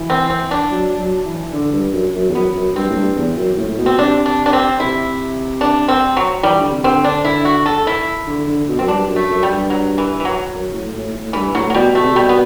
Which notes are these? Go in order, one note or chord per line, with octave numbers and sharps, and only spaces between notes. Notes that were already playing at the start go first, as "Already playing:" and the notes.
Already playing: E3
C4
C4
D4
F#3
F#3
E3
D3
G2
F#2
F#2
E2
F#2 B3
F#2
G2 C4
A2
G2
E2
F#2
A2
A2
B2
C4
B2
C3 D4
D4
D4
C4
C3 E4
D4
C4
F#3
E3 G3
D3
C3
D3 C4
D4
E4
F#4
A4
E4
D3
D3
B2
F#2 C4
G2 D4
F#2
A3
F#2
G3
G2
F#3
E3
E3
F#3
F#2
A2
A2
A2
G2 E3
A2 F#3
F#3
B2 G3
B2 A3
C3
B2 G3
B3